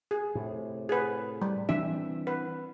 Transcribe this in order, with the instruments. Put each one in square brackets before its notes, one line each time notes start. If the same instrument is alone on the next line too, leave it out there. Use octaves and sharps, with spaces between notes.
[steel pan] G#4
[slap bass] A2 C3
[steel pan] G#4 B4
G3
[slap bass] E3 C4 D4 [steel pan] E5
[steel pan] B4